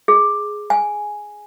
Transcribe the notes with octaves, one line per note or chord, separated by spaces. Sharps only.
G#4
G#5